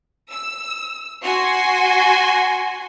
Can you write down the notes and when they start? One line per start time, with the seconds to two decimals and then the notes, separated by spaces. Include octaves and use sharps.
0.31 E6
1.23 F#4 G#5 C6